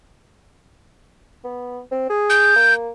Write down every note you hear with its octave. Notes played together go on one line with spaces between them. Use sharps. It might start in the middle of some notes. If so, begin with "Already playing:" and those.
B3
C4
G#4
G6
A#3